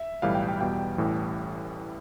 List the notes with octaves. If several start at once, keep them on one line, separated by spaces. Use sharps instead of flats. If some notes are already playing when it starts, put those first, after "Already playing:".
Already playing: E5
B1 A2 E3 G3 F5
G5
G5
E2 B2 G3 G5
A1 A2 E3 G3